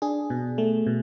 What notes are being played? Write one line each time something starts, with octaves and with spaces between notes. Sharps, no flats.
D4 G#4
B2
A3
B2